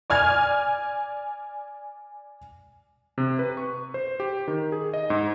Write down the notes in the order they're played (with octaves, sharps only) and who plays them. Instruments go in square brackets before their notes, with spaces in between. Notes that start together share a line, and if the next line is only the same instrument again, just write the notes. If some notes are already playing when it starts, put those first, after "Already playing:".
[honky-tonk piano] D5 G#5 F6 G#6
[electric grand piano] C3
B4
C#6
C5
G4
D#3
G#4
D#5
G#2